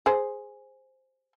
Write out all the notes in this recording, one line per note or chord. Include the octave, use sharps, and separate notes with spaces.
G#4 C5